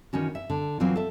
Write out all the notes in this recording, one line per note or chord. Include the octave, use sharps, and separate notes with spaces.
D#3 E3 C#4 F#4
E5
D3
E3 F#3 A#3 C4 F4
A4 E5